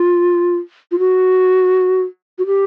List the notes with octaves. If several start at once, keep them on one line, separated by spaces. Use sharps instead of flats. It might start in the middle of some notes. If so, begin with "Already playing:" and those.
Already playing: F4
F4
F#4
F#4
G4